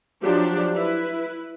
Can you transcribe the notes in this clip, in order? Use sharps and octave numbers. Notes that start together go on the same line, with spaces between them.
F3 F#3 D4 G4
E4 B4